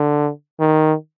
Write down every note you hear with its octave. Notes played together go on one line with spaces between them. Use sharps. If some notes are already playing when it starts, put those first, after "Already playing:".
Already playing: D3
D#3